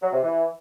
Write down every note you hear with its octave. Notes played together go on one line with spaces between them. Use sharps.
F#3
C3
E3